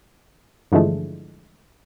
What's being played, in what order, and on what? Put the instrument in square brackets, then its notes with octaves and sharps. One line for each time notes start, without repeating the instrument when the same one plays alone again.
[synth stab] G2 D3 E3 F3 G#3 A3